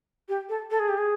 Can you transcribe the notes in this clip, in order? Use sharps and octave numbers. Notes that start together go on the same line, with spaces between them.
G4
A4
A4
G#4
G4
G#4